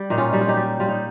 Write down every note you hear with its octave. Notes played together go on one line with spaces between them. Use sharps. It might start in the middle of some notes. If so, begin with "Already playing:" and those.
Already playing: G3
A#2 D#4
C#4 F4
G3 D#4
F4
D#4 G4
G3
G3 F4
D#4